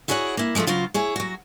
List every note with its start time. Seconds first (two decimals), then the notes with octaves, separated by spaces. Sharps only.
0.08 E4 F#4 G#4 C#5 D5 F#5
0.37 A#3 E4
0.55 F3 G#3 A3 E4 F4
0.67 C#3 F#3 F4 C5
0.94 E4 G#4 C#5
1.16 F#3 F#4